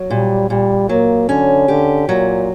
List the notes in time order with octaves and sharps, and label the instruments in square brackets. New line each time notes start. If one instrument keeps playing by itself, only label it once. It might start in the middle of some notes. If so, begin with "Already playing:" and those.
Already playing: [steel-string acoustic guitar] F#3
[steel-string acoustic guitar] A#2 [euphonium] G3
[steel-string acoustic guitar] A#2 [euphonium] G3
[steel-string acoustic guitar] F#3 [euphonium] A#3
[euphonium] D3 [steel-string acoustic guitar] C#4
[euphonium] D3 [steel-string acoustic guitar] G4
[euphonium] A#2 [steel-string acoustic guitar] F#3